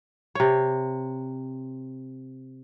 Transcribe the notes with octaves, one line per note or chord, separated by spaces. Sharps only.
C3 C#5